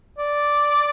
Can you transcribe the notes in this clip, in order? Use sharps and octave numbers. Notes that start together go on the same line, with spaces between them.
D5